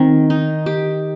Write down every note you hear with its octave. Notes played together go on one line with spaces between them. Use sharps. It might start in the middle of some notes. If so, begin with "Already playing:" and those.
Already playing: D#3 C4
D#4
G4